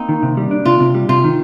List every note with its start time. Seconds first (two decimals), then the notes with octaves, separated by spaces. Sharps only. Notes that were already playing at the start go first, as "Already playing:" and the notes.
Already playing: A#3 C4 D#4
0.09 D#3
0.23 C3
0.37 G3
0.51 D4
0.65 C3 F4
0.80 C3
0.95 G3
1.09 C3 F4
1.24 D#3